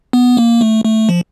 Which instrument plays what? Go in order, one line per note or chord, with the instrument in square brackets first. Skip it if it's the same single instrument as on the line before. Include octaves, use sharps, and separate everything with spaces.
[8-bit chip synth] B3
A#3
A3
A3
F3